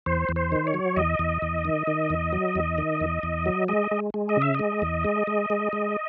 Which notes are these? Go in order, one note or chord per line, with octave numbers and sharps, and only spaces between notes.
E2 C5
E2
C5
D#3
C#5
F#3
E2 D#5
E2
E2
D#3
D#3
E2
F#3
E2
D#3
E2
E2
F#3
G#3 D#5
G#3
G#3
D#5
C#3 E5
G#3 D#5
E2
G#3
G#3
G#3
G#3